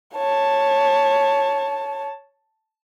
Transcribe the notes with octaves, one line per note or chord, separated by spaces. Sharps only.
C#5 A5